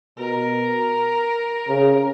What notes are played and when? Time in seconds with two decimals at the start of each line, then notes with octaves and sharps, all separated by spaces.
0.18 B2 A#4
1.68 C#3